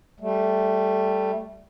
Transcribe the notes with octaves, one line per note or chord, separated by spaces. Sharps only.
G3 A3